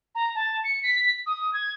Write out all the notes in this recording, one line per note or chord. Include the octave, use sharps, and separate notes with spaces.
A#5
A5
C#7
B6
D#6
G#6